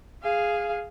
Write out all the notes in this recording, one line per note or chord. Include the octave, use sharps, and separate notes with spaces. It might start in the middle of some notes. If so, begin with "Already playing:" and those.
G#4 F5